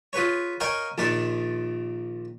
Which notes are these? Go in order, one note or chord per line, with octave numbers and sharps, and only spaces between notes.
F4 G#4 B4 C#5
A#4 C#5 D#5 F5 G5 G#5
A#1 A#2 D#3 D4 D5